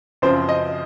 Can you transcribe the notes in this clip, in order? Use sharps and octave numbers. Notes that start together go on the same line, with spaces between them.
F#2 C#3 F3 C4 C5
D#5